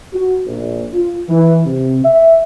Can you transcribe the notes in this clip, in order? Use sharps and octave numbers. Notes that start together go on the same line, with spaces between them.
F#4
A#1
F4
E3
C3
E5